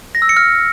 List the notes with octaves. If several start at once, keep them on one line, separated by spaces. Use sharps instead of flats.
A#6
E6
C#7
F6